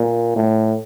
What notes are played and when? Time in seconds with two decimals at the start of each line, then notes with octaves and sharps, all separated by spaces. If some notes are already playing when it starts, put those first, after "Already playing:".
Already playing: A#2
0.36 A2